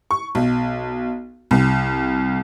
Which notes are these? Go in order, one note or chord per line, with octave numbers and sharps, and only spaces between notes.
C#6
B1
C2